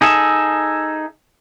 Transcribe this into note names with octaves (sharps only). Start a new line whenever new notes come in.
D#4 G#4 A4 E5